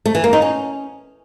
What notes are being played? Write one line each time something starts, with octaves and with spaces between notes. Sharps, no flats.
A3
E3
A#3
D#4
C#4